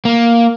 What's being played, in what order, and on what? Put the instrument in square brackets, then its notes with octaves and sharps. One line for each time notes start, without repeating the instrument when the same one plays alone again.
[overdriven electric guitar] A#3